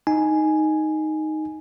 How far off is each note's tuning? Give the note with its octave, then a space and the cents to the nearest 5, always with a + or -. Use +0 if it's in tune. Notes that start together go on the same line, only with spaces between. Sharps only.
D#4 +0 G#5 +5